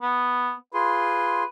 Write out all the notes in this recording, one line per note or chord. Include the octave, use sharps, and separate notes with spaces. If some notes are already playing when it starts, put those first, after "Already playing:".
B3
F4 G#4 B4 C6